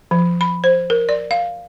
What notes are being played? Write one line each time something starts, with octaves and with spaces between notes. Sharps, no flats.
F3
B5
C5
A#4
D5
F5